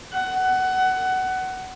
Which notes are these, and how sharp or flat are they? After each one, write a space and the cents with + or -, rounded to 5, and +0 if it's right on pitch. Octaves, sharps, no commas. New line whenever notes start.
F#5 +20